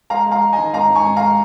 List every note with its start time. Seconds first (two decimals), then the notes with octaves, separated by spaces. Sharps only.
0.10 G#3 F5 A#5
0.26 G#3
0.31 F5 A#5
0.42 G#3
0.53 D#5 G#5
0.58 D#3
0.73 G#2 F5 A#5
0.89 G#2
0.95 G#5 C#6
1.06 G#2
1.16 F5 A#5
1.22 G#3